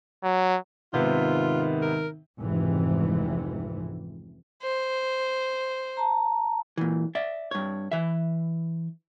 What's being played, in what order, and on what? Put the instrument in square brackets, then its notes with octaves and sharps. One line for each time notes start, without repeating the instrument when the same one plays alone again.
[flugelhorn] F#3
[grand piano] G#2 C3 B3 [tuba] D#3 [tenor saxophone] F4
[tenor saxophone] A#4
[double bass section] F1 C#2 G#2 C3 E3
[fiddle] C5
[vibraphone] A5 A#5
[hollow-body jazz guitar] A#2 E3
D5 E5
G2 C#5
E3 E5